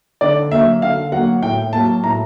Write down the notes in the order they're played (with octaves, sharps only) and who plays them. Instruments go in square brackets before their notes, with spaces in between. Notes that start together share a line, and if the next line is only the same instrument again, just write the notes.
[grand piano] D3 D5
F#3 A#3 E5
D3 F5
F#3 A#3 F#5
A2 G5
F#3 A#3 A5
A2 A#5